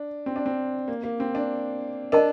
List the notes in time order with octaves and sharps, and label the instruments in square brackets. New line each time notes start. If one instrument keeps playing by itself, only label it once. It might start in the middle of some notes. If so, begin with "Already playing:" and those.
Already playing: [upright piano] D4
C4
D4
C4
A#3
A#3
C4
D4
[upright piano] D4 [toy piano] A#4 D#5 A5